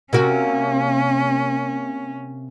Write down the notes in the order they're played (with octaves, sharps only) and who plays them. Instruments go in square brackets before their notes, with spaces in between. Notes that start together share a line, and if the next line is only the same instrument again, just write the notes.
[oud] C3 A#3 F#4 [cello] C#4